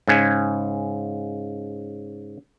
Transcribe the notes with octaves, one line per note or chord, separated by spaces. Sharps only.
G#2 C#3 G#5